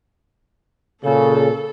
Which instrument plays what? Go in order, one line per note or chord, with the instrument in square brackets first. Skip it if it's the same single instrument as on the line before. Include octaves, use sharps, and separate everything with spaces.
[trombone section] A#2 C#3 [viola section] A4